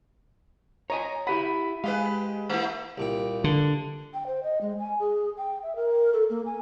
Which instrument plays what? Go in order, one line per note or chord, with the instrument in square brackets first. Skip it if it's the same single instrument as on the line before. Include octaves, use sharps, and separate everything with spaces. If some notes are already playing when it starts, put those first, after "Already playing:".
[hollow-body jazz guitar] C#5 D#5 G#5 [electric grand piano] A#5
[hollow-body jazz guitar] E4 G4 F#5 [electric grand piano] B5 B6 D#7
[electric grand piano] G#3 [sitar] G4 G#4 B4 [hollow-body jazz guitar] F5
[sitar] A3 A#3 E4
[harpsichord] C2 A#2 G5
[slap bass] D3
[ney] G5
C5
D#5
G#3
G#5
G#4
G5
E5
A#4
A4
A#3
G#5